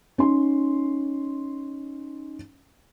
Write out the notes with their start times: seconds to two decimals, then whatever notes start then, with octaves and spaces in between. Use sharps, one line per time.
0.18 C#4 D#4 C6